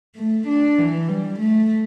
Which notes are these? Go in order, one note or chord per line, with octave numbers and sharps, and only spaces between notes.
A3
D4
E3
G3
A3